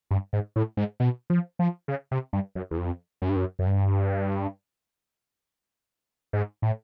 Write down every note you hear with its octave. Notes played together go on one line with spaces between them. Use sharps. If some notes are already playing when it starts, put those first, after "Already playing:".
G2
G#2
A2
G#2
B2
F3
F3
C#3
C3
G2
F#2
E2
F2
F#2
G2
F#2
F#2
G2
G#2
A2